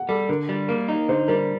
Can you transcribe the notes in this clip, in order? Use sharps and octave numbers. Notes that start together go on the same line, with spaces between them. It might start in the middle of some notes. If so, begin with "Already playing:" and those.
Already playing: F#5
G3 A4
D3 A#4
G3
A#3 A#4
D#4
D3 C5
G3 A#4